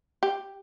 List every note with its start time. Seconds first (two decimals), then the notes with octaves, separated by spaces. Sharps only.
0.23 G4